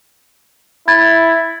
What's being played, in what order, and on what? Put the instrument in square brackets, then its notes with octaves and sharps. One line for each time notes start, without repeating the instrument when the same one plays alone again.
[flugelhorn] E4 [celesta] B5 G#6 A6